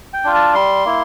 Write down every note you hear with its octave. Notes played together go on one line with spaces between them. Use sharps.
G5
D4 F4
A5
G3 C6
A#3 E4